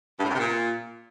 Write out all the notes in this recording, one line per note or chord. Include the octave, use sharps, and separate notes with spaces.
G2
A2
F#2
C3
A#2